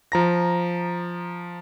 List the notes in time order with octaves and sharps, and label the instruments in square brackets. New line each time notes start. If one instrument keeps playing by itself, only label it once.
[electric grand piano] F3 A#5 A#6